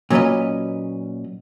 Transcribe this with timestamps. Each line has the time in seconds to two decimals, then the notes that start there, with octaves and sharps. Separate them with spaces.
0.10 A#2 F#3 C#4 B4 D#5